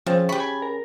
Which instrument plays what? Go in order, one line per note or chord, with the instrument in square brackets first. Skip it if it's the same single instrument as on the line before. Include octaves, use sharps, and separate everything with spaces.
[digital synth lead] F3 [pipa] C4 [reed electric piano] C#4 G#4 A6
[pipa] G4 B5 [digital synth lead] C#6
[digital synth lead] G#5
A#4